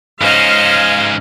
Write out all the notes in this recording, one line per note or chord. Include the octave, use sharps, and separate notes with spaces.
G#2 C#4 C5 D#5 F5